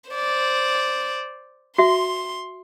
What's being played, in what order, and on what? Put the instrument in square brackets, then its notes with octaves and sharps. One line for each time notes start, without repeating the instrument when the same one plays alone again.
[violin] C5 D5
[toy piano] F#4 E5 [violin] C6